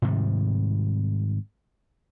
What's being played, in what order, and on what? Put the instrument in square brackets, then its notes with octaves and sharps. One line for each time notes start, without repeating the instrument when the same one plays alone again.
[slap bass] G#2 C3 D#3 G3